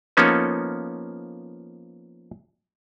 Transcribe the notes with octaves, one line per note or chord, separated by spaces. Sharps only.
F3 A#3 B3 C#4 D#4 A4